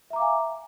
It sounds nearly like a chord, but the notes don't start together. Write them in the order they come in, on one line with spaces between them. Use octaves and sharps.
E5 A#5 D6 F5 G#5